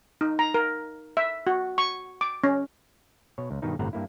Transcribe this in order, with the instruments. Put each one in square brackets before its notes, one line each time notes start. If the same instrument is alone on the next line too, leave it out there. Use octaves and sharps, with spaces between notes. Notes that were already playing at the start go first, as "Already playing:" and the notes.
[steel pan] D#4
A#5
A#4
E5
F#4
C#6
D6
C#4
[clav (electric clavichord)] B2 C#5
C#2
G2 B2 D#3 D#4
G1 A2 C3 C5 F#5 A#5
G2 A#3 E4